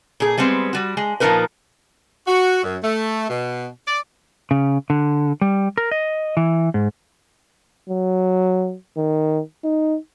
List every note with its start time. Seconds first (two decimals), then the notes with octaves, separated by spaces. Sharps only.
0.20 A#2 G#4
0.38 G3 G#3 B3 C4
0.73 G3 F#4
0.97 G#3
1.20 A#2 F3 A#3 D#4 A#4 B4
2.27 F#4
2.64 F#2
2.83 A3
3.29 B2
3.87 D5
4.51 C#3
4.90 D3
5.41 G3
5.78 A#4
5.91 D#5
6.37 E3
6.74 G#2
7.89 F#3
8.97 D#3
9.64 D#4